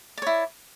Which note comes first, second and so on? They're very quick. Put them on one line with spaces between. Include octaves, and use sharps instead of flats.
D5 C#5 E4